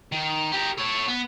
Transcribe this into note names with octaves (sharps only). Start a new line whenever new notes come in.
D#3
G4 A#4
A4 C#5
B3